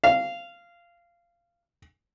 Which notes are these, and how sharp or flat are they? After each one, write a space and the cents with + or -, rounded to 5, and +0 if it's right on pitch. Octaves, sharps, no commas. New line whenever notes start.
F5 -15